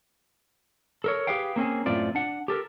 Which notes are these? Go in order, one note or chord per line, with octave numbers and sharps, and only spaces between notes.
A4 A#4 C#5
G4 G#4 B4 F5 G5
A#3 C4 C#4 G#4
F#2 A2 C4 F4 D5
D4 F#5
G4 A4 A#4